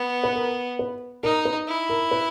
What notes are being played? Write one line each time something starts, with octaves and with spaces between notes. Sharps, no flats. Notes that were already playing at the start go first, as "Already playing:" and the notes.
Already playing: B3
B4
A#4
B4
D#4 A#4
B4
E4
A#4
B4